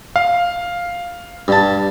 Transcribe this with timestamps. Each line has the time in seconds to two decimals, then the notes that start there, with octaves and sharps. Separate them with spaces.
0.16 F5
1.48 G2 A5